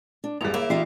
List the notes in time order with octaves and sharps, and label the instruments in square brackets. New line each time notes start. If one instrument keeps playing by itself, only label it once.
[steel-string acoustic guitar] D4
[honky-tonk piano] A1 F#2 G3 [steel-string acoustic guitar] B3 [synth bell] G#4 F7
[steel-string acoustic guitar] D#2 [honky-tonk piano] A#3 D7 [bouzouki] E4
[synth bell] E3 C7 [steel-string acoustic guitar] D#4 F4 G4